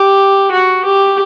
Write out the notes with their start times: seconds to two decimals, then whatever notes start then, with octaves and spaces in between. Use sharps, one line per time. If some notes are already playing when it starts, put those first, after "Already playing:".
Already playing: G4
0.51 F#4
0.84 G4